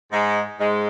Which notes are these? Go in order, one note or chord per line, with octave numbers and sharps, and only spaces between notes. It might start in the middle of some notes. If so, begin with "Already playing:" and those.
G#2 G#3
G#2 G#3